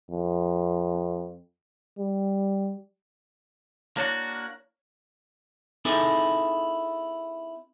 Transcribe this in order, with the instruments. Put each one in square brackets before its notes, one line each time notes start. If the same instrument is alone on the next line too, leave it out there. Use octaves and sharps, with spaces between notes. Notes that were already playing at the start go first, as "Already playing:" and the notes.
[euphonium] F2
G3
[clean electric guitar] A#3 D4 F#4 [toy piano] E4 C#5 C#6
[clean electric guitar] C4 D#4 E4 G#4 A4 B4